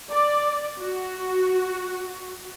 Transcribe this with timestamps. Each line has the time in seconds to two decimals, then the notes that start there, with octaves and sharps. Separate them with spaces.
0.10 D5
0.80 F#4